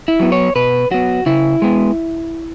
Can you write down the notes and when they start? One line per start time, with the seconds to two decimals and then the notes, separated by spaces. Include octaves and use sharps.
0.08 E4
0.20 F#3 B3
0.32 C#5
0.55 B2 B4
0.91 F#3 B3 F#4
1.26 C#3 E4
1.62 G#3 B3